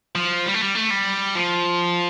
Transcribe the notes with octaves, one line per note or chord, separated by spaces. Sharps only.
F3
G3
A3
G3
A3
G3
F3